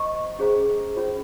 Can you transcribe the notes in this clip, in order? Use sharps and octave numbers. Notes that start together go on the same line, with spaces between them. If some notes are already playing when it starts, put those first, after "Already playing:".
Already playing: C5 D#5 A#5 C#6
C#4 G#4 C5 F5 A#5
C#4 F4 C5